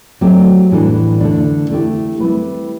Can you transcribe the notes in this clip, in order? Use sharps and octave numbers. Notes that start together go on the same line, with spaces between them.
F#3 A3 C4 G4
A2 E3 G3 D4 A4
D3 A3 D4
A3 C4 E4 G4
G3 C4 E4 B4